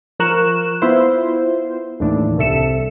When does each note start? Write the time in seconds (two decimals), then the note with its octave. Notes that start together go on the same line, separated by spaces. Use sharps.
0.19 F3 A#4 C#6 F#6 E7
0.82 B3 E4 F4 C5
2.00 D#2 A2 E3 D4
2.38 C2 C3 A4 E5 C#7 E7